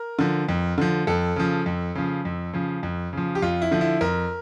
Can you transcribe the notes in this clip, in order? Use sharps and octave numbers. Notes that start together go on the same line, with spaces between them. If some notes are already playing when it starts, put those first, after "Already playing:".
Already playing: A#4
D3 F3
F2
D3 F3
F2 A4
C#3 F3
F2
C#3 F3
F2
C#3 F3
F2
C#3 F3
G4
F2 F4
E4
D3 F3
E4
F2 A#4